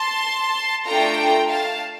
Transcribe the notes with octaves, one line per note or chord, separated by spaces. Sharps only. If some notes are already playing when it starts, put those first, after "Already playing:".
Already playing: A5 C6
A3 D4 F4 A4 G5 A#5
F5 A5